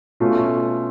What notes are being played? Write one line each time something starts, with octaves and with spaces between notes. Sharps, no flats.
B2 A3 C#4 F4